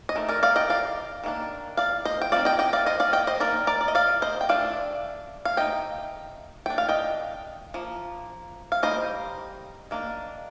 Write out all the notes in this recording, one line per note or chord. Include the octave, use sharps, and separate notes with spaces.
D#5
D#3 A3
A#4 D5
D5 F5
D#5 G5
D5 F5
D#3 A#3 D4
D5 F5
C5 D#5
G5
F3 C4 D#4 D5 F5
D#5 G5
D#5 G5
D5 F5
C5 D#5
D5 F5
D#5 G5
C5 D#5
D#3 A#3 D#4 A#4 D5
A#4 D5
D5
D#5
D5 F5
C5 D#5
G5
A3 D4 D5 F5
F5
A3 D#4 D#5 G5
A3 D4 G5
F5
D#5 G5
F3 A#3
F5
G3 A#3 D#4 C5 D#5
D#3 A#3 D4